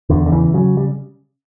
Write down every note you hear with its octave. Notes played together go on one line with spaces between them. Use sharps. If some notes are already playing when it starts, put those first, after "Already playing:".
E2 D3
D3
C#3 E3
C#3 F#3
G3